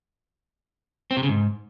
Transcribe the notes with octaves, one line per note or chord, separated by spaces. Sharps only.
C4
C3
C#3
G#2